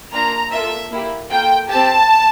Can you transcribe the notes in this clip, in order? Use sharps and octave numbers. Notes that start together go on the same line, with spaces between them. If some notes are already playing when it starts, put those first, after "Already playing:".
A#3 D4 F4 A#5
A#3 F4 A4 E5
A#3 E4 G4
A#3 F4 A4 G5
C4 G4 A5